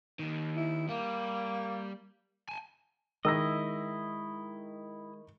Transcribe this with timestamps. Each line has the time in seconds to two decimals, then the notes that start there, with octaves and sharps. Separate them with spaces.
0.19 D#2 D#3
0.55 E4
0.89 G3 A#3
2.49 G#5 A5
3.25 D#3 G#3 E4 D#5 E6 A#6